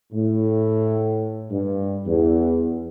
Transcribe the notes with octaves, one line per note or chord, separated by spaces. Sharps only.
A2
G2
E2